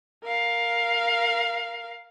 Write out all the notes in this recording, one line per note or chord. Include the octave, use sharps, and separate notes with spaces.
A#4 F5